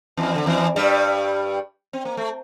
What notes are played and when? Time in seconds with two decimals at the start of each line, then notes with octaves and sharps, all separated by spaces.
0.17 E2 E3
0.35 D3
0.46 E2 E3
0.76 G2 G3
1.93 C4
2.05 A#3
2.17 A3